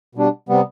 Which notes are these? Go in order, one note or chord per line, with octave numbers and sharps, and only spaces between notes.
B2 G3 D4
C3 G3 B3